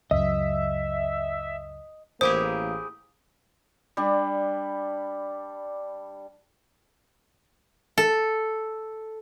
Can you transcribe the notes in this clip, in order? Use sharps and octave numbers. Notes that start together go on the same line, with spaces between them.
C#2 F#2 D#5 E5
A1 A#3 E4 G4 G#4 C5 D#6
G3 D4
A4